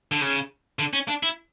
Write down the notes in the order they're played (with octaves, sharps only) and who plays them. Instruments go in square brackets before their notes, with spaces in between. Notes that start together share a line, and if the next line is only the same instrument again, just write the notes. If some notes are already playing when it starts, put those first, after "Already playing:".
[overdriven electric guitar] D3
C#3
D3
C#4
D4
E4